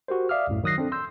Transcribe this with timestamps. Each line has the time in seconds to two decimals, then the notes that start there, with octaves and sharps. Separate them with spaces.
0.08 F#4 G4 A#4 C5
0.29 D5 E5 F5 D6 D#6 F6
0.48 C2 F#2 A2
0.63 D#3 F#3 D#6 F#6 A#6 C7
0.78 C4 D4 A4
0.92 C6 E6 G6